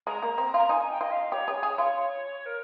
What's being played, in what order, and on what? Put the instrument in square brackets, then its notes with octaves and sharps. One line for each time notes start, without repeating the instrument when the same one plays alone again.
[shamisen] G#3 [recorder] A#5
[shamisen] A#3
C4
[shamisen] F4 [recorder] A#5
[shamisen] D#4 [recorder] G#5
[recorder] G5
[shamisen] F4 [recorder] D#5
[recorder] F5
[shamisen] G4 [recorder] C#5
[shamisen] G#4
G#4
F4
[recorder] A#4